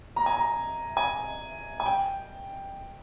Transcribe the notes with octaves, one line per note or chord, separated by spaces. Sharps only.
A#5
G#5
A#5
G#5
G#5
G5